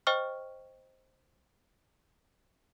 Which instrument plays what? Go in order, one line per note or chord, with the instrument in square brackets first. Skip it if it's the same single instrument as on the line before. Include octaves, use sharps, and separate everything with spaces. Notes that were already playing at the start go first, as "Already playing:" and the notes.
[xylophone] C5 D#5 G5 C#6 F6